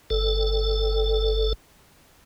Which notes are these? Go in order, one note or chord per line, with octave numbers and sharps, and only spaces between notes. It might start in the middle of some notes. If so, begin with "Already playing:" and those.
G1 A4